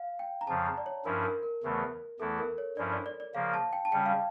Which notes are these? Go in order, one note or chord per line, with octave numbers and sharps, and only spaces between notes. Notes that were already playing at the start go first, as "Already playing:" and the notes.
Already playing: F5
G5
A#5
F2 C#3 F3 A5
A#5
D5
C#5
G2 F3 C#4 E4 A#4
A#4
A#4
E2 C#3 E3 A3
E2 E3 A3 E4 A4
A#4
C#5
G2 F3 C#4 E4 D5
D5
D5
D5
C#3 F3 A#3 F5
A5
G5
A5
C#3 G3 C#4 G5
F5